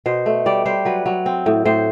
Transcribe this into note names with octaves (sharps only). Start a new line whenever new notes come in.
B2 C5
A3
G3 D5
G3 C5
F#3 B4
F#3
C4
A2
A2 C5